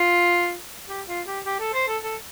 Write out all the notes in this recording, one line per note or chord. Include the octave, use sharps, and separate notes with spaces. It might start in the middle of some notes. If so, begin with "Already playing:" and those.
Already playing: F4
G4
F4
G4
G4
A4
C5
A4
A4